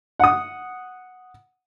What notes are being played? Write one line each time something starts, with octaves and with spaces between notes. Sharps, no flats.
F#5 D#6